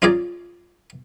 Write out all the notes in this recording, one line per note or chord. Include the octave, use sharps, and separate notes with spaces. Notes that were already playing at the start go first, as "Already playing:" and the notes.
C#4 F4 G#4 D5 G#5 A#5